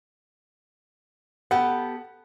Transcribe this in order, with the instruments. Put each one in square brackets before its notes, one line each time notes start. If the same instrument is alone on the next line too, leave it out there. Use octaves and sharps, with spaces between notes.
[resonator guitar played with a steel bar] B3 G4 A4 [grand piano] F#5